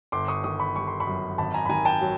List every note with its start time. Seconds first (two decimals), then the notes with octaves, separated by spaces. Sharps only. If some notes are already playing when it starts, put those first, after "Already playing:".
0.12 G1 C6 D6
0.28 C#6 D#6
0.44 D#3 C#6 D#6
0.60 B5 C#6
0.76 G3 C#6
0.88 C6
1.00 B5 C#6
1.07 F#2
1.38 G#1 A5 B5
1.54 G#5 A#5
1.66 B5
1.69 D#3 G#5 A#5
1.85 G5 A5
2.01 F#3